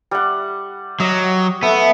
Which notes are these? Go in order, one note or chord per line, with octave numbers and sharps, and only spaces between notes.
G3 F#5
F#3 D#5
A3 B3